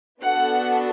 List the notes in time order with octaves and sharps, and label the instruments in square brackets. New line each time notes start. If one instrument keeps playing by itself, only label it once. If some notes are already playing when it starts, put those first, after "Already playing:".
[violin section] B3 D4 F#4 A4 F#5